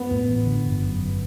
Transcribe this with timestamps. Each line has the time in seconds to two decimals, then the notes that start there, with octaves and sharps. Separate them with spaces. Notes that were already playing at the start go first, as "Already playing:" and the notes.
Already playing: B3
0.11 A2
0.29 A1
0.46 D3
0.65 G1
0.83 F#2
1.01 G1